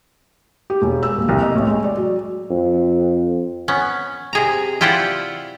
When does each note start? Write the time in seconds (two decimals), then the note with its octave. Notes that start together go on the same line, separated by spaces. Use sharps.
0.70 G4
0.82 E1
1.03 E6
1.17 D#1
1.29 C2
1.42 D#5
1.55 A1
1.67 G#3
1.84 D5
1.97 F#3
2.50 F2
3.68 B3 C#4
4.33 C3 G#4 A#5
4.81 E4 F4 G4 C5 D5 F#5